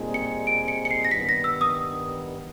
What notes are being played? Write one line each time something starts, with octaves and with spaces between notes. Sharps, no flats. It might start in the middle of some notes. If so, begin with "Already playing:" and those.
Already playing: A#2 G3 C4 D#4 G#4
C#7
D7
C#7
C#7
C7
A#6
G2 D#3 G3 B3 B6
A#6
E6
D#6